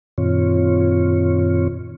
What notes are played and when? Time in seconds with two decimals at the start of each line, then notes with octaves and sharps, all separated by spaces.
0.18 F#2 A#2 D#3 C4 F4 C#5